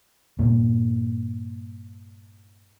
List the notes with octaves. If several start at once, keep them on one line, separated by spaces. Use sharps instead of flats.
G2 A#2 A#3